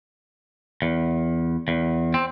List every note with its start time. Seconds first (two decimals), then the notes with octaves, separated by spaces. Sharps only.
0.82 E2
1.68 E2
2.14 C4